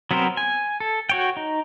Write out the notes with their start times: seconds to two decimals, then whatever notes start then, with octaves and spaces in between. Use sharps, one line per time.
0.11 F#3 B3 C4 A#4 C5
0.37 G#5
0.80 A4
1.09 F#4 C#5 G5
1.37 D#4